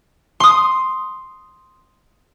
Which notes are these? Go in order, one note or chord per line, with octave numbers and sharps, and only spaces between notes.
C6 D#6